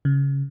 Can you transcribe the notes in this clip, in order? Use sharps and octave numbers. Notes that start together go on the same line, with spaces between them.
C#3